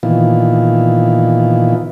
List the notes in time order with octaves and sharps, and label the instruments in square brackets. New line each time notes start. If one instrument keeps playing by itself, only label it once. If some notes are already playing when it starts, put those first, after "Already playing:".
[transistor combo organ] A#2 D#3 E3 B3 F4